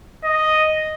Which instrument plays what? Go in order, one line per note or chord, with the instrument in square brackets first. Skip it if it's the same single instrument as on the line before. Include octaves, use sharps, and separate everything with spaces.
[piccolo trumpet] D#5